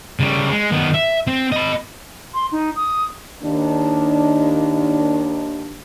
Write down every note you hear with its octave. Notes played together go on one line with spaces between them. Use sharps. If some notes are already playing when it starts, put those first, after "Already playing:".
C#3 G3
G#3
D#3 B3
E5
C4
D#5 B5
C6
D#4
D#6
D#2 D#3 D4